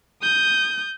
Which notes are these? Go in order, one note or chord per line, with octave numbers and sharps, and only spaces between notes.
D#6 G6